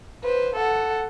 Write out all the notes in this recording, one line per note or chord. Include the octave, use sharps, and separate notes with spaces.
B4 C5
A4 F#5